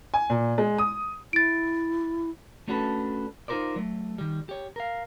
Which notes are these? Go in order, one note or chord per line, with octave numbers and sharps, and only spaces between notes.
G#5
A#2
G#3
D#6
E4 A6 D7
A3 C#4 D4 F#4 A4 B4
D#4 F4 A4 A#4 C5 D5
F#3 A3
D#3 G3
G4 C#5
A#4 F5